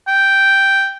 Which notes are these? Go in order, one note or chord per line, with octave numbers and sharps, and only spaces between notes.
G5